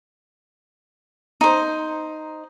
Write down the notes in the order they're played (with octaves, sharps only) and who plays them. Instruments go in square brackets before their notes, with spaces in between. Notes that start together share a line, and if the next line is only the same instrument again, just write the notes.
[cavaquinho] D#4 C5